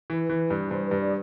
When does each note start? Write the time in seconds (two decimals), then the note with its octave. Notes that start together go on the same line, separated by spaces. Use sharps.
0.10 E3 B4
0.30 E3
0.50 G2
0.70 G2 C5
0.87 G2 B4
1.02 D5